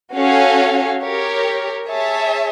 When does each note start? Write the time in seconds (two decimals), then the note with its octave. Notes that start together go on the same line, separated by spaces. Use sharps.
0.15 C#4 F#4 A4 C#5 F5
1.02 G4 A#4 C#5
1.89 G#4 C#5 E5 A5